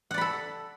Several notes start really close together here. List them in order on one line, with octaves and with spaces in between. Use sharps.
F#5 D5 B5 A4